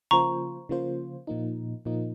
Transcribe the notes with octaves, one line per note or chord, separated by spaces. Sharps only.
C#3 F3 A#3 F4 C5 A#5 C#6
C#3 F3 A#3 F4 C5
A#2 F3 A#3 D#4
A#2 F3 A#3 D#4